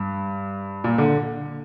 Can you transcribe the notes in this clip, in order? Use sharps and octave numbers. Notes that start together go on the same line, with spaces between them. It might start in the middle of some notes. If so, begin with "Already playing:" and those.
Already playing: G2
A#2
D3